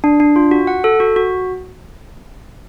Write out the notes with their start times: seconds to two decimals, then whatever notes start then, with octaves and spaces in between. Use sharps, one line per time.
0.04 D4
0.20 D4
0.36 F4
0.51 F#4
0.67 F#5
0.84 A4
1.00 F#4
1.16 F#4